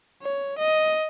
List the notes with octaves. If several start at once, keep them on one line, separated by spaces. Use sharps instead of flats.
C#5
D#5